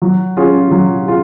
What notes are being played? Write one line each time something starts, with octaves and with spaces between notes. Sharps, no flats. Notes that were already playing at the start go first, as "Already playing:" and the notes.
F#3
C#4 F4 G#4
F#3
C#4 F4 G#4